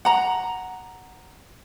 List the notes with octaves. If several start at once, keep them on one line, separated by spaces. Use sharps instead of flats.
F#5 A#5